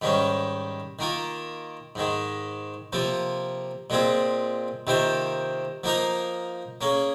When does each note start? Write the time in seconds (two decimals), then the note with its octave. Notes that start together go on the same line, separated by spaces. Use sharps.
0.02 G#2 D#3 G3 C#4
0.99 D#3 A#3 F4
1.95 G#2 D#3 G#3
2.93 C3 F3 A#3 F4
3.90 A#2 G#3 C4 F4 G#4
4.87 C3 D#3 A#3 F4 C5
5.84 F3 A#3 D#4 A#4 F5
6.81 A#3 C#4 G#4